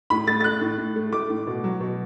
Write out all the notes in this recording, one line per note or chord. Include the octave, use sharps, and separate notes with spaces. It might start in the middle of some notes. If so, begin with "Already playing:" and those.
A2 B5
A3 A6
A6
A3 F#6
A2
A2
A3
A3 D6
A2
B2
F#3
B2